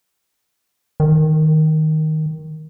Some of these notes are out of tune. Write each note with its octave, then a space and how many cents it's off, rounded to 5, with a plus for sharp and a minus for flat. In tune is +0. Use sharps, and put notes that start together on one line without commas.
D#3 +5